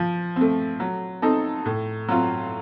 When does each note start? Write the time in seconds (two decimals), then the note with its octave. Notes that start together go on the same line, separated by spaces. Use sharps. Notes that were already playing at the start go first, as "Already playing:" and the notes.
Already playing: F3
0.36 A3 C4
0.80 F#3
1.22 C4 D#4 A4
1.65 A2
2.08 F#3 C4 F4